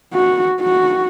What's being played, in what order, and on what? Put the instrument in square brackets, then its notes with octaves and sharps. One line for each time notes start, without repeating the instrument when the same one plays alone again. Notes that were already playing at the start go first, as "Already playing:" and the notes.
[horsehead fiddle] F#4
F#4